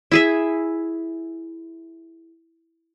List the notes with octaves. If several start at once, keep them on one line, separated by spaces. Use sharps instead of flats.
E4 G#4 E5